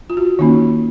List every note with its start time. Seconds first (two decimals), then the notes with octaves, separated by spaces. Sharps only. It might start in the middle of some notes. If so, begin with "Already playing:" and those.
0.10 F4
0.17 F#4
0.39 D#3 A#3 C#4 D#4